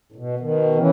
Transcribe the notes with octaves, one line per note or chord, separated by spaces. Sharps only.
A2
B2
B2 D#3
C#3 E3